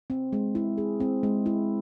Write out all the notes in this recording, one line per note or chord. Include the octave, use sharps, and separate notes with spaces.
C4
G#3
E4
G#4
C4
G#3
E4